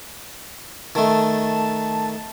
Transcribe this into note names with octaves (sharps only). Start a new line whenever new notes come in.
D#3 A3 A5